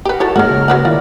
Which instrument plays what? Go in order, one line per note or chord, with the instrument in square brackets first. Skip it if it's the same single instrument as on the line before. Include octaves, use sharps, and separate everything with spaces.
[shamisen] G4 B4 [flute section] A#4 F#5
[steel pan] E4 A5 [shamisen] F#4 A4 C#5
[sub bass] G2 [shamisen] F#3 F#4 [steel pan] G#3 A#3 [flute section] A#4 C#5 F6
[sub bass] C#3
[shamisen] F#3 B4 F#5
[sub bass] D#3 [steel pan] E4 D5 [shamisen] F4